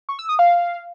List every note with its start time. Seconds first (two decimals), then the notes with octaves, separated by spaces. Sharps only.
0.09 C#6
0.19 E6
0.29 D#6
0.39 F5